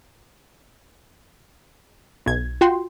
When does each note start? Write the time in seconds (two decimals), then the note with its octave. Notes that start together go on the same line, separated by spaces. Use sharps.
2.26 B1 G#6
2.61 F4 F#4 G5 C6